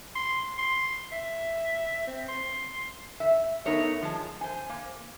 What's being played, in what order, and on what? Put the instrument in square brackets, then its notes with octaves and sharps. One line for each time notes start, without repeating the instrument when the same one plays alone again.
[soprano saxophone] C6
C6
E5
C4
C6
[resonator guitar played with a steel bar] E5
A3 B3 D#4 A#4 C#5 E5
F3 G#3 A5
C5 G#5
A#3